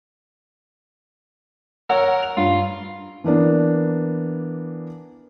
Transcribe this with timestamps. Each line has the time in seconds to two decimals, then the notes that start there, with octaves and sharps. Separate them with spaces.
1.90 A#4 C#5 F#5 E6
2.22 F7
2.37 G2 F4
3.24 E3 A#3 B3 D4